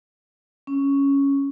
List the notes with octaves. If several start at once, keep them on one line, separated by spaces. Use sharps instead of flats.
C#4